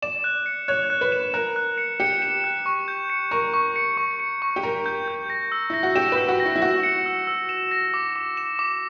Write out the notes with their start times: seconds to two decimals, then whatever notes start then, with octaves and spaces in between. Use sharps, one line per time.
0.02 D5 E7
0.24 F#6
0.46 C#7
0.68 C#5 F#6
0.90 F#6
1.01 B4
1.12 E7
1.34 A#4 F#6
1.56 F#6
1.78 C#7
2.00 G4 C#7
2.22 E7
2.44 F#6
2.66 C#6
2.88 G6
3.10 C#7
3.31 A#4 C#6
3.54 C#6
3.76 C#7
3.98 C#6
4.20 C#7
4.42 C#6
4.56 G4
4.63 A#4 C#6
4.86 G6
5.08 G6
5.30 A#6
5.52 E6
5.70 E4 A#6
5.83 F#4
5.95 G4 E7
6.12 B4
6.18 E6
6.29 F#4
6.40 A#6
6.45 E4
6.56 E4
6.61 F#4 A#6
6.83 C#7
7.06 E6
7.27 E6
7.49 E7
7.71 A#6
7.94 D6
8.16 D6
8.37 E7
8.59 D6